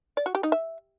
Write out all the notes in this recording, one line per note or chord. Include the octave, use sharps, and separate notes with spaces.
D5
F#4
G4
D#4
E5